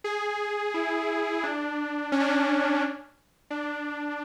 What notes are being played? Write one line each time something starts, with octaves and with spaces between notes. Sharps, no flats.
G#4
E4
D4
C#4
D4
C#4
D4